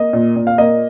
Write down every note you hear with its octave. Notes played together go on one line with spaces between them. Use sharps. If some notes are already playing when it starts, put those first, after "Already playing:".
Already playing: A#3 D#5
A#2
A#2
F5
A#3 D#5